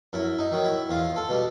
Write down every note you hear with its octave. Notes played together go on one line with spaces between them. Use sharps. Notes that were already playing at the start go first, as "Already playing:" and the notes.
F#2 E4
D#4
D#3 F#3
E4
E2 F4
A4
B2 G3